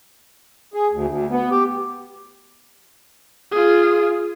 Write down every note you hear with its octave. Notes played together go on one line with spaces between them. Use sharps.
G#4
D2
D2
B3
G4
F4 G#4